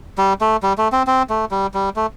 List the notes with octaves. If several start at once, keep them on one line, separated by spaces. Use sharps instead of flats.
G3
A3
G3
A3
C4
C4
A3
G3
G3
A3